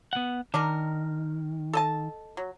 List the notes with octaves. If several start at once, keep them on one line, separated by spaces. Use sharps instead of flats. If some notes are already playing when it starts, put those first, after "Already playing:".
B3 F#5
D#3 D4 D#4 A#4
A4 D#5 A5
F#3